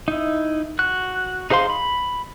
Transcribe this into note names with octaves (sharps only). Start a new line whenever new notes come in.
D#4 E4
F#4 F#6
D#4 G#4 C5 F5 C6
B5